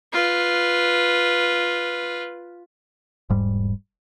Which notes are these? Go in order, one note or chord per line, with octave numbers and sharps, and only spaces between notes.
F4 B4
E1 G#2 G3